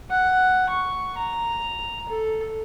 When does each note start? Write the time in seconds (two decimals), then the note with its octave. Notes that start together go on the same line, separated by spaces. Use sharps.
0.10 F#5
0.70 C#6
1.17 A#5
2.09 A4